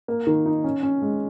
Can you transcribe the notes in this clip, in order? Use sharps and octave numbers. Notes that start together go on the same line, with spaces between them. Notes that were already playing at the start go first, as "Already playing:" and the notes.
A#3
D#3
D#4
C#4
C#4
G#3